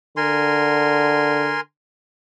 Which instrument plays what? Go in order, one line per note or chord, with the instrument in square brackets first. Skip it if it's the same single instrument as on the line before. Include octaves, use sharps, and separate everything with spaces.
[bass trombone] D3 [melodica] A#4 G#5 C6